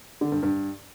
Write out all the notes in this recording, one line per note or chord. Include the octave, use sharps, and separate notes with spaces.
D3
G2
G2